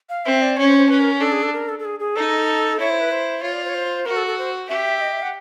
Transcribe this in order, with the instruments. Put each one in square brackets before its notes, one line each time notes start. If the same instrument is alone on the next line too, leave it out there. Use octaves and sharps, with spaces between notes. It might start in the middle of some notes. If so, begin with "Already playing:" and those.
[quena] F5
[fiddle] C4 [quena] E5
[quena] D5
[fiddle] C#4 [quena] C#5
[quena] C5
C5
[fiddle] C#4 [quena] B4
[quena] A#4
[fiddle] D4 [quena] A4
[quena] G#4
A4
A#4
A4
A4
G#4
G#4
[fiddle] D#4 [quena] A4
[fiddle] E4 [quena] C#5
[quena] C5
B4
C5
[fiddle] F4 [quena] C#5
[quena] D5
C5
C#5
C5
[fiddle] F#4 [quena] A#4
[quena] A4
A4
C5
[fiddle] G4 [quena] E5
[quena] D#5
E5
F#5